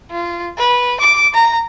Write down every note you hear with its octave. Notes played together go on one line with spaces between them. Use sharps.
F4
B4
D6
A#5